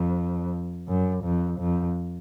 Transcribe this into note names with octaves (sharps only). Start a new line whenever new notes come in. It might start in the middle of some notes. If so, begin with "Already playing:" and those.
Already playing: F2
F#2
F2
F2